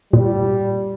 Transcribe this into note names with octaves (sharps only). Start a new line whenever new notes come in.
A#2 G3